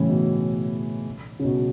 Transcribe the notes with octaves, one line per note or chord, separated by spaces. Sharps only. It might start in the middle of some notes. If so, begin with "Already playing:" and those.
Already playing: A2 C#3 E3
B2
C#3
B2